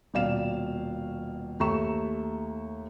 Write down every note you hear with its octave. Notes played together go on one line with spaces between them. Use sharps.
D#1 B2 D5 F5 E7
D#2 A3 E5 A#5 C#6 E7